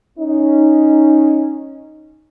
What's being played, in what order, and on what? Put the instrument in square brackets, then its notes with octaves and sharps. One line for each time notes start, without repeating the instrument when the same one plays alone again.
[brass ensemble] C#4 D#4